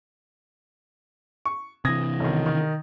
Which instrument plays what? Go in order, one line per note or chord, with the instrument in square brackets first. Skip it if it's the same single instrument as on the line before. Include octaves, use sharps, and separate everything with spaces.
[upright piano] C#6
[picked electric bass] C3 E3 [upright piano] D#6 G#6 A#6
[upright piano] B1 D#3
D#3